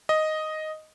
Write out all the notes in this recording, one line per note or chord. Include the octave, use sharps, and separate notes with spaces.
D#5